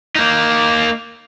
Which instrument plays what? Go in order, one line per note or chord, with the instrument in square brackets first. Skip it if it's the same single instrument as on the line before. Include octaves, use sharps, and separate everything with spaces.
[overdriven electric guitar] A#3 D#4